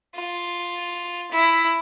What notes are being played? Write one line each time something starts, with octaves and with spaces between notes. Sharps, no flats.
F4
E4